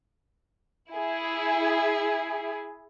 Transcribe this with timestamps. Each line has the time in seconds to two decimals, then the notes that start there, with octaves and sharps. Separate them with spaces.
0.92 E4 G#4